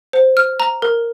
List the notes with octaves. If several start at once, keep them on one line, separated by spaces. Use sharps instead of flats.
C5
F6
A#5
A#4